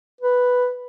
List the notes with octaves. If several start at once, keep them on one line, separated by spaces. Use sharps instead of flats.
B4